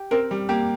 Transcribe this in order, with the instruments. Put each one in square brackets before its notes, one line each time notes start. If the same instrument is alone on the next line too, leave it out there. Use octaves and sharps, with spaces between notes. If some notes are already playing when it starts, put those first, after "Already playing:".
Already playing: [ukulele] G4
[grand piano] C4 [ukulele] A#4
[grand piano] G3
[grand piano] A#3 [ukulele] G4